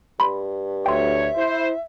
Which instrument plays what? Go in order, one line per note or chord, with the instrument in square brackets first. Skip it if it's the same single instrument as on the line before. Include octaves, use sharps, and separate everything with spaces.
[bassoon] G2 [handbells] B5 C6
[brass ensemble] D2 C#5 [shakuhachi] E5 [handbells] G5 C6
[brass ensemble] E4 C5